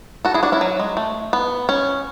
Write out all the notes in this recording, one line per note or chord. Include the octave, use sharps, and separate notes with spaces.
F#4 A4
E4 G#4
D4 F#4
C#4 E4
F#3
G#3
A3
B3
C#4